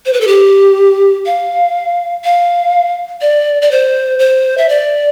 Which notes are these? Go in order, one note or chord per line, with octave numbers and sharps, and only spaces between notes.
C5
B4
A4
G4
F5
F5
D5
D5
C5
C5
E5
D5